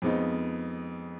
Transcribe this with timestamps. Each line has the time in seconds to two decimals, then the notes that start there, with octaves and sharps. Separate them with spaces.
0.02 F2 F3 G#3 B3 D#4